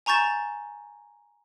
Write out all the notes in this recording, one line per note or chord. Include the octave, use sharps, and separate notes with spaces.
G#5 A#5 C#6 G6 A6 E7